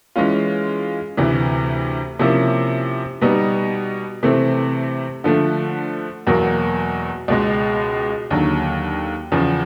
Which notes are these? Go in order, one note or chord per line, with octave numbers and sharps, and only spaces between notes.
E3 G#3 C#4 F4
D2 C3 E3
C3 F3 A#3 C#4 E4
B2 G3 B3 D#4
C3 E3 A3 C4
D3 F3 A3
E2 B2 F#3 A#3
C#2 B2 G#3
D#2 D3 F#3
E2 C#3 F3